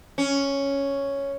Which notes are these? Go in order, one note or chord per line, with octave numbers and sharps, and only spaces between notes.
C#4